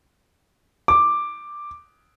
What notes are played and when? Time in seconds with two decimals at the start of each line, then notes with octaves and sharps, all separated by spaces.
0.88 D6